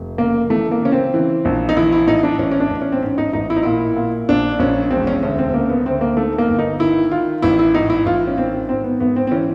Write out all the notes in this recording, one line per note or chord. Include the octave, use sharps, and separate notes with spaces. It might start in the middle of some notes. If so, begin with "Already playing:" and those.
Already playing: F1
C#3 A#3
E3 A3
A#3
C#3 C#4
C4
E3
A#1
D#4
E3 E4
E4
A2 D#4
D4
A1 C#4
C#4
D4
A1
C#4
C4
G#2 C#4
D#4
A1 D#4
E4
D#4
A#2 E4
A#2
A#1 D4
A#1 C#4
E1 C4
C#4
D2 C#4
C4
C#3 A#3
B3
D2 C4
A#3
D#3 A3
A#3
G1
D#4
D#3 E4
D#3 F4
A1 E4
E4
G#2 D#4
E4
A1 F4
C#4
D#3 C4
G#2 C4
B3
G#1 B3
C4
C4
E3 C#4